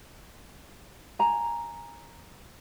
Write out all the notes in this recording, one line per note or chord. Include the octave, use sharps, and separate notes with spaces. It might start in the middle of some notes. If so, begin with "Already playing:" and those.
G#5 A#5